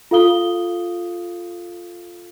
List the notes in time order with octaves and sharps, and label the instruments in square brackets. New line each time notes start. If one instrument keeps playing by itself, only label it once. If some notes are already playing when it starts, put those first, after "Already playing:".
[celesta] F4 A4 F5 D#6 G7